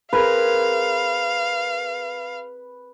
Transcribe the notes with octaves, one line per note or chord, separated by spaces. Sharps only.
C4 G#4 A#4 B4 F5